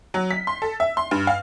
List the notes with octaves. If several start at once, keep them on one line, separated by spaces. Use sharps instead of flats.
F#3
B6
C6
A4
E5
C6
G2
F5